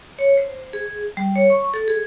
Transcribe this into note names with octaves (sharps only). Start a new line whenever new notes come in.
C#5
C5
G#4
G3
C#5
C#6
A4
G#4